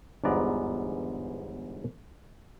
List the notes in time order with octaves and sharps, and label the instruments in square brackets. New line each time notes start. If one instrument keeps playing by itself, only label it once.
[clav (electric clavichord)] G1 E2 G#2 B3 D5 A#5